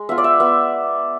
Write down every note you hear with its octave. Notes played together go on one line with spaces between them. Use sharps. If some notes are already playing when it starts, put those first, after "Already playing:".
Already playing: G#3
B3 F4 E5
D5
E5
B3 E5